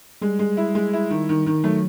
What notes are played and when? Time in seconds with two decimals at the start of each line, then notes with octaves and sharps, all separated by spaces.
0.22 G3 G#3
0.39 G#3
0.57 E4
0.75 G#3
0.93 E4
1.10 D#3
1.29 D#3
1.46 D#3
1.64 F#3 A3